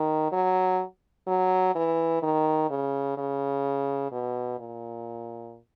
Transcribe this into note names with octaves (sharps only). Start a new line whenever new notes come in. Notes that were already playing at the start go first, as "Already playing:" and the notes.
Already playing: D#3
F#3
F#3
E3
D#3
C#3
C#3
B2
A#2